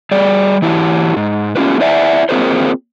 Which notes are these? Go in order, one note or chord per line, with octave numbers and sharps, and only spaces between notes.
G3 G#4 D5
E3 E4 F#4 G4
G#2
A3 B3 C#4 F4 G4 B4
E4 C5 D5 E5 F#5 G#5
A#3 C4 F4 G#4 A#4 C5